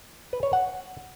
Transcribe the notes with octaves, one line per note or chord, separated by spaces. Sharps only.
B4
C#5
F#5